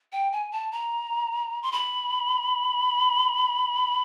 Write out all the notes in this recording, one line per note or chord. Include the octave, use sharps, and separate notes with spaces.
G5
G#5
A5
A#5
C6
B5